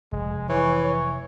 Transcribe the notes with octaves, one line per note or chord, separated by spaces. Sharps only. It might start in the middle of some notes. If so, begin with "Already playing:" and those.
F1 G#3
E3 C#5
C#5